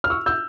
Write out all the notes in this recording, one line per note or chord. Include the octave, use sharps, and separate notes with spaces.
F6
C#6 E6
E6 G6